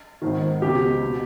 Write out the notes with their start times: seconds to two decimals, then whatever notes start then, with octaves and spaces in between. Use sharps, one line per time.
0.22 G#1 G#2 D#3
0.62 C#2 B2 G4
1.04 B2